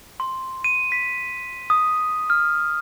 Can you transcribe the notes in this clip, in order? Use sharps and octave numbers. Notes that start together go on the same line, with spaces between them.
C6
D#7
B6
D#6
F6